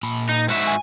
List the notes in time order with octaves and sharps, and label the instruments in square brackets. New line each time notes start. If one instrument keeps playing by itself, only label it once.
[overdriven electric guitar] A#2 B5
[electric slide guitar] D#4
G#2 F#4 E5
[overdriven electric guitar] G#5